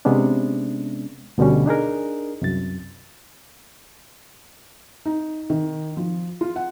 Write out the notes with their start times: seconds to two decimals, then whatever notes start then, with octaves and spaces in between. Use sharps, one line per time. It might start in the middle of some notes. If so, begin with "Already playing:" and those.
0.05 C3 G#3 B3 C#4 D4
1.38 D2 B2 D3 G3 C#4
1.66 D4 D#4 G#4 A#4
2.42 C2 F#2 A6
5.05 D#4
5.50 D#3
5.97 F3
6.41 F4
6.56 F#5